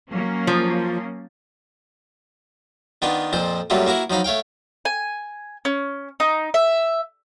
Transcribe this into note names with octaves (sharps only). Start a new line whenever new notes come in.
F#3 A#3 C#4
F3
D#3 B3 D4 F4
F2 A#2 F3 C5
F#2 F#3 G3 A3 A#3 F4
A#3 E4 F#4 A#4
F3 F#3 D#4 F5 B5
A3 C#5 F5 G5
G#5
C#4
D#4
E5